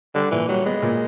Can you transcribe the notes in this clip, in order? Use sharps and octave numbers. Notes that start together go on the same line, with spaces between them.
D3 G3
A#2 E3
F#3 G3
G#3 B3
A#2